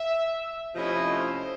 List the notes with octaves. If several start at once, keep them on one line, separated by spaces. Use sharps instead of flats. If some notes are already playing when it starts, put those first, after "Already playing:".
Already playing: E5
C3 F3 A3 C#4 E4 D#5
C5